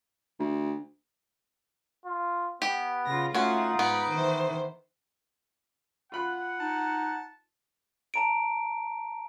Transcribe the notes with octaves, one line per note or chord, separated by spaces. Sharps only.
D2
F4
B3 G4
C#3 F4 A#6
A3 C#4 D#4 F4 F#4 F#5
G#2 B3 B5 D6
D#3 E3 C5
F4 F#5 B5 F#6
D#4 A5
A5 A#5 D7